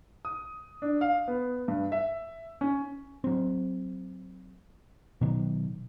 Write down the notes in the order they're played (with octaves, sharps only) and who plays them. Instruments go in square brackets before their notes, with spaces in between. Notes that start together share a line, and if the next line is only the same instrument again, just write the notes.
[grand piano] D#6
D4
F5
B3
G2
E5
C#4
[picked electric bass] F#3 C4
B2 D#3 F#3